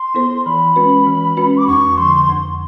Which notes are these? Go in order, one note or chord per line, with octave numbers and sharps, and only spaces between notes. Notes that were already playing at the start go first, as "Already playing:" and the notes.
Already playing: C6
B3 E4 A4 C5
E3 B5
G#3 C#4 F#4 B4
E3
G#3 C#4 F#4 B4
D6
F2 C#6
D3 F3 C6
F2